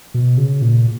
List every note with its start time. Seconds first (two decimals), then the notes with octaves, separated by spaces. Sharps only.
0.14 B2
0.37 C#3
0.62 A#2